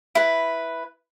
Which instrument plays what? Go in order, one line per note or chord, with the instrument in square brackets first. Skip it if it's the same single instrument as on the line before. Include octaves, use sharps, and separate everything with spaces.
[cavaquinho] E4 B4